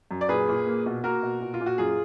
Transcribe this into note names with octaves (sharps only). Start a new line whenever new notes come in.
F#2
D5
A#2 G#4 B4
A#2
A#3
B2
A#3 F#4 A#4
B2
A#2
F4
A#2
F#4
F#2 F4 G#4